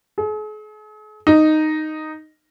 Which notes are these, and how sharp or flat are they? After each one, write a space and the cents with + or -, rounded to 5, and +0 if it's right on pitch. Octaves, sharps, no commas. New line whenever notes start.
G#4 +45
D#4 -5